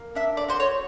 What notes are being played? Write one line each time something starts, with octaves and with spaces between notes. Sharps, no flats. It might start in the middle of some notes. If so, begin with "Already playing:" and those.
Already playing: A#3
D4 E5
D5
F#4 C5
C#5